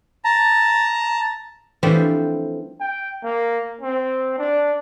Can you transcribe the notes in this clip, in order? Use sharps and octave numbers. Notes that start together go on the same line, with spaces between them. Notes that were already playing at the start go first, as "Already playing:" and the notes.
A5 A#5
E3 F3 G3 A3 C4 D4
G5
A#3
C4
D4